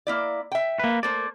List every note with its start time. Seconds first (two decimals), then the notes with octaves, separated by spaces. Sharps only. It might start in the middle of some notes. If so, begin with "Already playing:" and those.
0.07 A#3 E4 D5
0.52 E5 G5
0.79 A#3 B4
1.03 A3 A#3 C5 D5